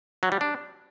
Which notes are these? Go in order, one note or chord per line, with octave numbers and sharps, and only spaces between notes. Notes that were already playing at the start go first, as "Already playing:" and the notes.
F#3
G3
D4